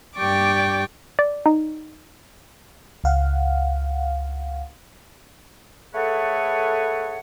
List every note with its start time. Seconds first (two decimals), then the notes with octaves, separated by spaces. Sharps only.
0.16 G2 G4 D5 G5 C#6 D6
1.19 D5
1.46 D#4
3.04 C#2 F5 F#5
5.95 A3 G#4 A4 B4 C#5 F#5